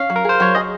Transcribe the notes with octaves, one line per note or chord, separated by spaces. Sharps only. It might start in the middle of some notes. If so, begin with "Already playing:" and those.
Already playing: C#4 F5
F#3
A#4
G#4 C5
F#3 C#5
G#4 D#5